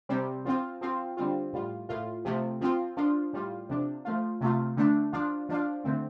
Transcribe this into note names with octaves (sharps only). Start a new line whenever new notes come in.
C3 G3 C4
F3 C4 F4
F3 C4 F4
D3 G3 C4 F4
A2 G3 F4
A2 A3 F4
C3 F3 A3
F3 C4 F4
F3 D4 F4
A2 G3 F4
C3 F3 D4
F3 A3 F4
C3 A3 F4
D3 A3 D4
F3 D4 F4
F3 D4 F4
D3 A3 C4